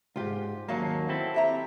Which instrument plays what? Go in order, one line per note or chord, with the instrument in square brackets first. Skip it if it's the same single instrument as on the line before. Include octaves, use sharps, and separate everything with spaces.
[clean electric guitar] C#2 G#2 [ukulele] F4 G4
[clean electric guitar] D#2 F#3 A#3 [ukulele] C#4 F5 A5
[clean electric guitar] C4 E4 A4
[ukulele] G4 E5 A#5